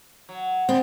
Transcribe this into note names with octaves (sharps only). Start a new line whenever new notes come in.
F#3
D3 B3 C4